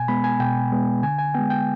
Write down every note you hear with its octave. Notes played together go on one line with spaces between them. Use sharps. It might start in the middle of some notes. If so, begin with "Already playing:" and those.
Already playing: B2 G#5
G#3 B3 B5
G#5
B2 G5
G#3 B3
D3 G#5
G#5
G#3 B3 G5
G5